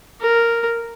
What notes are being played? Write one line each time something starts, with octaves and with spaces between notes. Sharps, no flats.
A#4